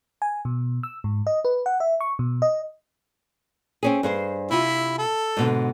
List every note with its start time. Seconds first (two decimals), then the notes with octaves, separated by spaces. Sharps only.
0.22 G#5
0.45 B2
0.83 E6
1.04 G#2
1.27 D#5
1.45 B4
1.66 F#5
1.80 E5
2.01 C#6
2.19 B2
2.42 D#5
3.83 C4 C#4 G#4
4.03 G2 G#4 C5
4.51 C3 E4 F4
4.98 A4
5.37 G#2 B2 D3